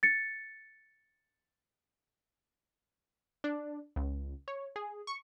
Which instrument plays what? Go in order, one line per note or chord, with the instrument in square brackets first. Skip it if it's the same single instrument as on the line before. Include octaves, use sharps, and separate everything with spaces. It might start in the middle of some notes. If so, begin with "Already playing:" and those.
[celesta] A6 C#7
[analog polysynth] D4
C#2
C#5
G#4
C#6